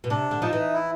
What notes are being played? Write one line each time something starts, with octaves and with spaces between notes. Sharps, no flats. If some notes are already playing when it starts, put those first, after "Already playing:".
B2
C3 D4
D3
F3 D#4
E3
E4